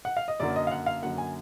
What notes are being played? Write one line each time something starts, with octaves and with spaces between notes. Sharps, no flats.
F#5
F5
D#5
F#2 D3 F#3 A#3 D5
D#5
F5
F#5
F5
F#2 D3 F#3 A#3 F#5
G#5